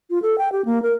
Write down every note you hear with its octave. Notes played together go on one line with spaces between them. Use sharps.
F4
A4
G5
G4
A#3
A#4